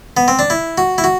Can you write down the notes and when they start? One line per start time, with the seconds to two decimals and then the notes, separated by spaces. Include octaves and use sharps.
0.17 B3
0.28 C4
0.39 D4
0.50 E4
0.78 F#4
0.98 E4
1.04 F#4